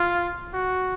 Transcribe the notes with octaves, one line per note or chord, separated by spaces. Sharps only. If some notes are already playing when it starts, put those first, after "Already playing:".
Already playing: F4
F#4